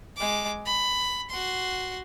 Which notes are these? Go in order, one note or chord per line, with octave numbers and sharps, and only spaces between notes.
G#3 D6
B5
F#4 C6